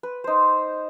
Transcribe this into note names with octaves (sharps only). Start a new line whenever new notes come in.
B4
D#4 C5